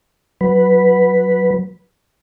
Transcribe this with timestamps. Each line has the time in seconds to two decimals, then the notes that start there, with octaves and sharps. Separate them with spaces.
0.41 F#3 B4